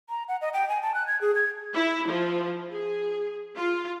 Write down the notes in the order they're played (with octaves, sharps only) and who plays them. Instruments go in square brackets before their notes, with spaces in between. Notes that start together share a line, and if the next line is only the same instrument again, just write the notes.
[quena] A#5
F#5
D#5
G5
G#5
A5
F#6
G#6
G#4
G#6
[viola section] E4
F3
G#4
F4